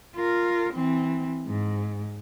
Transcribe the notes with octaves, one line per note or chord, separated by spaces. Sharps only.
F4 A#4
E3 C4
G#2